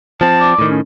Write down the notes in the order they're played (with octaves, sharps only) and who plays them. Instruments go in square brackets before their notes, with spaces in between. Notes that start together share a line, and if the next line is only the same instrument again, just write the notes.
[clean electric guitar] F3 C4 [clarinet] A5
[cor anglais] D5
[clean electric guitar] A2 D#3
[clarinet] C#4